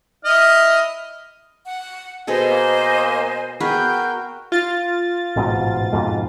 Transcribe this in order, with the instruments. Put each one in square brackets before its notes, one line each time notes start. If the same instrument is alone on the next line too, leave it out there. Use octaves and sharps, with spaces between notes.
[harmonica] E4 D#5 F6
[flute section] F#5
[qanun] B2 G#4 A4 [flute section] C5 D#5 G#5
[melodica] A#3
[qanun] B3 G#4 B4 [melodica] F#4 A#4 [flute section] G5
[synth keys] F4 A6
[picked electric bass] A1 G#2 B2
F2 G#2 B2